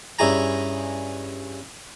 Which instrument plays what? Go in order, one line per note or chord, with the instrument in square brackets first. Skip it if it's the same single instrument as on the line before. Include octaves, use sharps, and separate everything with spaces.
[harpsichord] G2 C#4 E4 G#4 G#5 A#5